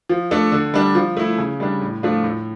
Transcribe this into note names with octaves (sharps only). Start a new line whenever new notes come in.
F3
A3 D4 A4
D3
G3 D4
F3
A3 E4
C#3
G3 D4
A2
F3 A3 D4 F4
A2